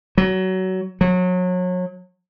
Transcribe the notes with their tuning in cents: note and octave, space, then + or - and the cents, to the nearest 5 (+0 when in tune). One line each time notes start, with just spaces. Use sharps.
F#3 +20
F#3 -30